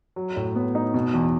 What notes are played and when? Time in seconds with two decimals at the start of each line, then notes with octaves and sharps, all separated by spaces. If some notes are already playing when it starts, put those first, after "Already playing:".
0.16 F#3
0.36 A2
0.56 B3
0.75 D#4
0.94 B2
1.14 E2